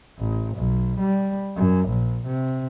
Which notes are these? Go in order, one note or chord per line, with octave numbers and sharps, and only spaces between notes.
A1
B1
G3
F#2
A#1
C3